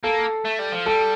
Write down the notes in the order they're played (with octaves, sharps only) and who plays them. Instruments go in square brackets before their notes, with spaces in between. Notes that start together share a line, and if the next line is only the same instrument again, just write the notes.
[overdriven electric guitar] A#3 [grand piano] A4
[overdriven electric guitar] A3
G3
F3
[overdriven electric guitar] G3 [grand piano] A4